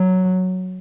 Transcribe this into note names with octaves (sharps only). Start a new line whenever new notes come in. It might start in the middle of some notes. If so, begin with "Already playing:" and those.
Already playing: F#3